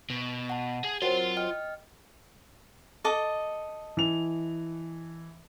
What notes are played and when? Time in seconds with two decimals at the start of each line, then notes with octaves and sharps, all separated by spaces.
0.10 B2
0.50 F#5 A5
0.84 G#4
1.02 F#3 C4 F4 A#4 C5 F#5 C6
1.37 D#5 G5 F6
3.04 A4 D#5 D6
3.97 E3 F7